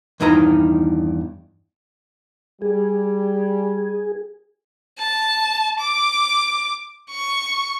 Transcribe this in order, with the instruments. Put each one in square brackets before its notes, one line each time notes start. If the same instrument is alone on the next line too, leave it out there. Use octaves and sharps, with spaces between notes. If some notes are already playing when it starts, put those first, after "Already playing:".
[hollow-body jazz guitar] E2 G2 D#3 D#4 E4 A#5
[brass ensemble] G3 [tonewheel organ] G#4
[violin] A5
D6
C#6